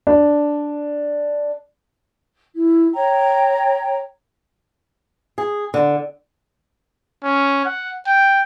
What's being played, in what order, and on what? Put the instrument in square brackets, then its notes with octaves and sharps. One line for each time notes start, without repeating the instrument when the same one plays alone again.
[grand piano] D4
[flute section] E4
C#5 G5 A#5
[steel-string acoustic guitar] G#4
D3
[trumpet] C#4
F#5
G5